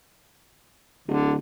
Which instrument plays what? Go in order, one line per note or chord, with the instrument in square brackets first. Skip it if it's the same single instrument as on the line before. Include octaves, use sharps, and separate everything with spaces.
[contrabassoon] D1 [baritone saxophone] D3